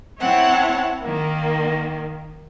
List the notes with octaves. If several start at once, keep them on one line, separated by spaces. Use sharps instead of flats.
C4 E4 C#5 F#5 A5
D#3 A#3